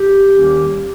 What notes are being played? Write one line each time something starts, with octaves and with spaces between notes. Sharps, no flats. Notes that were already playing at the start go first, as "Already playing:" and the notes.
Already playing: G4
D#2 D#3 G3 A#3 C#4